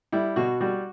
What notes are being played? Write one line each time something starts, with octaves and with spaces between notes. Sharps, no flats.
G3 E4
B2 F#4
G3 F#4